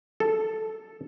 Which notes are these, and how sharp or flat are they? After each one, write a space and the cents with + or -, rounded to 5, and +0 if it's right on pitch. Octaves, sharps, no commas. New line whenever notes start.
A4 -5